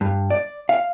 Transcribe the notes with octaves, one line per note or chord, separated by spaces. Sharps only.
G2
D5
F5